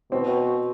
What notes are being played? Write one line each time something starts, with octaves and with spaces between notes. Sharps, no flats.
B2 C4